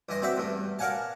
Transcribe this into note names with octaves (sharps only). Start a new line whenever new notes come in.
G2 E3 D#5 C6
C4 F#4 D5 E5 G5
E2 G2 A3
A#4 D5 F5 F#5 G#5 A5